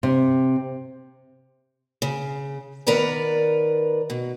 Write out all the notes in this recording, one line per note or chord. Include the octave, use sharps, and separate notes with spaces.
C3
C#3
D#3 B3 A#4 B4 D5 A#5
B2